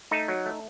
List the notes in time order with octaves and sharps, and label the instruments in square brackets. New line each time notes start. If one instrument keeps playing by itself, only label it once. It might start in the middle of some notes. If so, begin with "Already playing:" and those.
[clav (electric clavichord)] A3 D#4
F#3
A3